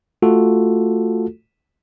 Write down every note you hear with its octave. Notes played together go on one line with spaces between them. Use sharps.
A3 F4 F#4 A4